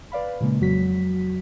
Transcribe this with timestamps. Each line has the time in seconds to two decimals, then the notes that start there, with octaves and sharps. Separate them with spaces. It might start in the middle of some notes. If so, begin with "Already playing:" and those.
0.12 B4 D5 F5 B5
0.40 A#2 C#3 G#3 A#3
0.60 F2 F#3 F#4 B6